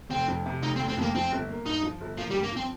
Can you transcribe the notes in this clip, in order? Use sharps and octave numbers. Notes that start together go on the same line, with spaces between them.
F1 C4
F2
C3
F1 D#4
C4
F1
C4
F2 A#3
F3 C4
G1
A#3
G2 D#4
F3
G1
F3 A#3
G3
G2
A#3
F3 C4